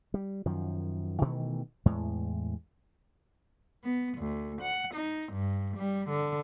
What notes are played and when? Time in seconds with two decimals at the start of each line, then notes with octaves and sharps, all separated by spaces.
0.14 G3
0.46 F#2 D#3 F3
1.21 B2 D#3 E3 A3
1.85 E2 A2 G#3
3.84 B3
4.18 D2
4.62 F#5
4.94 D#4
5.33 G2
5.77 G3
6.09 D3